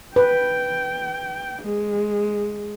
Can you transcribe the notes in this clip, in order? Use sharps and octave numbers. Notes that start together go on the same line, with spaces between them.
B4 G5
G#3